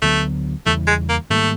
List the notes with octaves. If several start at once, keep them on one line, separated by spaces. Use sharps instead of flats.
D2 D3 F#3 A3 B3
E2 C#3 E3 G3 A3
G#3
A#3
G#2 D#3 G3 A3 A#3